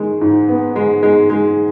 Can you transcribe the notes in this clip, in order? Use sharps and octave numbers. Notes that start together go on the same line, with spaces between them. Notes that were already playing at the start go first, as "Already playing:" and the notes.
Already playing: D#3 G#3
G#2
B3
G#3
G#3
G#3